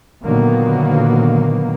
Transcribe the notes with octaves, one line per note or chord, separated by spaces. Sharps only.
A#2 D3 D#3 F#3 A#3 B3